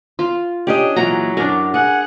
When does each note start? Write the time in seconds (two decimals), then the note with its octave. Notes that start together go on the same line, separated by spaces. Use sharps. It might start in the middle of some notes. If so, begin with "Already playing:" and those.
0.19 F4
0.67 C#4 D4 G4 D#5
0.96 A#2 E3 F#3 G#3 A#5
1.37 F#2 D4 A#4
1.74 G#4 F#5